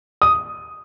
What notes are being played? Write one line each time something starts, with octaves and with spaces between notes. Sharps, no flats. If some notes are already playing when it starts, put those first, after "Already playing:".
D#6